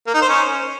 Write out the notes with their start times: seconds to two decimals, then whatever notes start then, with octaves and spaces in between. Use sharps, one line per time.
0.07 A#3
0.14 D#4
0.22 C5
0.29 C#4